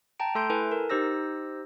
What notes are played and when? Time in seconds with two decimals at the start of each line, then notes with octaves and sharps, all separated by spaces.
0.19 G5 A5 A#5 D7
0.35 A3 A4 C6 G6 D7
0.50 E4 A4 B4 G#5
0.71 A#4
0.90 D#4 G4 C5 E6 A#6